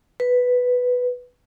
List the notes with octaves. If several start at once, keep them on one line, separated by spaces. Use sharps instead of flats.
B4